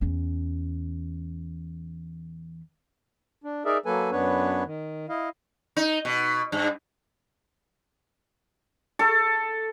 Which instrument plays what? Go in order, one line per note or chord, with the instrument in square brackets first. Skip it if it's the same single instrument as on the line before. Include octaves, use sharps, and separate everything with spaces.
[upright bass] E2 C#4
[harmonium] D4
D#4 G#4 A#4 D5 E5
F#3 A#3 A4 B4 G#5
F#2 B3 D4 B4 C#5
D#3
E4 D#5 F5
[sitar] D#4
B2
G2
[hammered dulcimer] A4